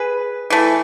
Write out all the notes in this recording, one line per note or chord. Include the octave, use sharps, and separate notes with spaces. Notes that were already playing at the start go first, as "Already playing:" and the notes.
Already playing: G#4 B4
E3 A3